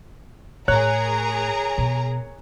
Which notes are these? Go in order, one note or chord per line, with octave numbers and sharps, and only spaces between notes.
A2 G#4 A#4 C#5 A#5 F#6
B2